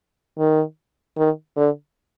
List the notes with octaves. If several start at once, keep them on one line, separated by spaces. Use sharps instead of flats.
D#3
D#3
D3